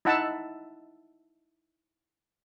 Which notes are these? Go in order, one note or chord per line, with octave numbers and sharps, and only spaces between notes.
D#4 E4 E5 F#5 A5 E6